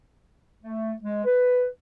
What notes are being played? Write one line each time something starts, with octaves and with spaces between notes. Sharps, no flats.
A3
G#3
B4